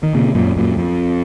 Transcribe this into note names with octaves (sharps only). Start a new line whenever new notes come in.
D#3
A#2 C#3
F#2 A#2
F#2 A#2
F2